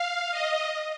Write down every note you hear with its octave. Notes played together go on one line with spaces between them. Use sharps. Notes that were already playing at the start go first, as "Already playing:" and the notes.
Already playing: F5
D#5